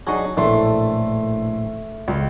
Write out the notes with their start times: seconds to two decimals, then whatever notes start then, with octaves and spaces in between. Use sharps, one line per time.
0.07 F#3 D4 D#4 F#4 G#4
0.37 A#1 A2 E3 A3 D4 A4 C6
2.08 C#2